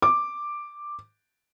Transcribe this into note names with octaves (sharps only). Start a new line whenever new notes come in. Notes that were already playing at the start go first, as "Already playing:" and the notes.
D6